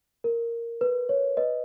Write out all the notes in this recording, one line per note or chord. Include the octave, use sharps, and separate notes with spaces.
A#4
B4
C#5
B4 D#5